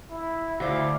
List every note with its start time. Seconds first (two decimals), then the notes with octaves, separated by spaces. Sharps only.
0.11 E4
0.60 D2 E4 F#4 C5 D5 F5